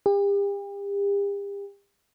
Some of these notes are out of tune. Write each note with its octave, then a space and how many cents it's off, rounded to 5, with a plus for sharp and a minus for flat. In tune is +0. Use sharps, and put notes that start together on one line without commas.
G4 +40